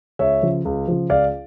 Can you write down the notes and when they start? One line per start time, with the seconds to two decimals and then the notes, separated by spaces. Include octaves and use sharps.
0.19 C#2 C#5 E5
0.42 C#3 F3
0.65 C#2
0.88 C#3 F3
1.10 C#2 D5 F5